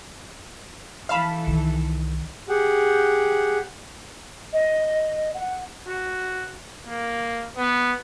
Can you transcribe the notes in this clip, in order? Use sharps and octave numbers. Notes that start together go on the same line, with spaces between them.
E3 A4 F5 A5 B5
C2 D#3
G4 G#4 F#5
D#5
F#5
F#4
A#3
B3